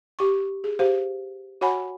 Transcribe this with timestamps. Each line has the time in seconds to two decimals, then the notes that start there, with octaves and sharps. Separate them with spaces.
0.19 G4 C#6
0.64 G#4
0.79 G4 C5 F5
1.61 F#4 C#5 F#5 G#5 B5